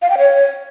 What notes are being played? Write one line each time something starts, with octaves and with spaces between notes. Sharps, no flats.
F5
G5
C#5